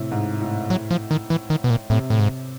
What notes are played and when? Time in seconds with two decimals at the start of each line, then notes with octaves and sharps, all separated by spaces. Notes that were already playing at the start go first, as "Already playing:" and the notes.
Already playing: A2 C3
0.11 G#2
0.40 A2
0.70 F#3
0.91 F3
1.11 D#3
1.30 E3
1.50 D#3
1.64 B2
1.70 A#2
1.90 A2 C3
2.10 A2
2.19 G#2